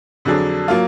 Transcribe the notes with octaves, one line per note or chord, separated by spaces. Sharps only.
F2 D3 F#3 D4 G#4
F#3 A#3 F4